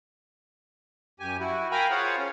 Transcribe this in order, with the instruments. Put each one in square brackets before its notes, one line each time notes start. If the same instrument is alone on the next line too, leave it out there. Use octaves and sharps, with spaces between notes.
[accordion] F#2 G4 G#5
E4 F#4
A#4 F5 G5 G#5 A#5 B5
F4 G#4 C5 C#5 F5 F#5
C#4